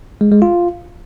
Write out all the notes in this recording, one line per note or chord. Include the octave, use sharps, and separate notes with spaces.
G#3
G#3
F4